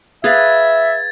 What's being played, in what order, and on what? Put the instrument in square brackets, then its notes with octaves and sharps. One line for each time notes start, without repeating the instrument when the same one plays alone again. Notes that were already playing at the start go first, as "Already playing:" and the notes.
[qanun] G#4 B4 F5 [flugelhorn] E5 [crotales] G#6 A6